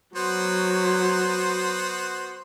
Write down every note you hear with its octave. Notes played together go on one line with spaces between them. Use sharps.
F#3 B3 F#4 C5